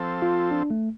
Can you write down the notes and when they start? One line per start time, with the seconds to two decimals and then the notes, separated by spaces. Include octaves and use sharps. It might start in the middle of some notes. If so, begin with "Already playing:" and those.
Already playing: F3 C4 A4
0.22 F4
0.51 D4
0.71 A3